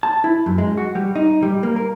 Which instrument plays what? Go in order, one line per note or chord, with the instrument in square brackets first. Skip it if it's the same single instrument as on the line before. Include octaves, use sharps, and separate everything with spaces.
[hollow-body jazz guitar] A5
E4
F#2
G#3
F#4
G3
D#4
G3
A#3
A#4